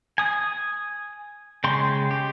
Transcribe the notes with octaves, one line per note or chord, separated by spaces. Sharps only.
G#5 D#6
C#3 G#3 G5 C6 C#6
G4